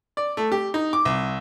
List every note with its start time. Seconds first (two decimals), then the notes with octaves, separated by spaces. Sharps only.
0.17 D5
0.37 A3
0.52 G4
0.74 D#4
0.93 D6
1.05 C2